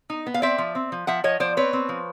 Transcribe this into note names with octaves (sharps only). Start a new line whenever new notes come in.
D#4
B3
F5
C4 D5 E5
F3
C4
F3
F3 E5 F#5
F3 C#5 D#5
F3 C5 D5
C4 B4 C#5
C4
F3